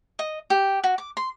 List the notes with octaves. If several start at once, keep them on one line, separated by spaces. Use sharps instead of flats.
D#5
G4
F#4
D6
C6